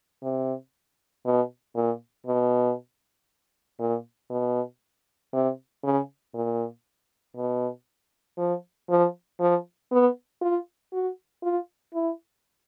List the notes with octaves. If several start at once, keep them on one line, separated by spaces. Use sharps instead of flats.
C3
B2
A#2
B2
A#2
B2
C3
C#3
A#2
B2
F3
F3
F3
B3
F4
F#4
F4
E4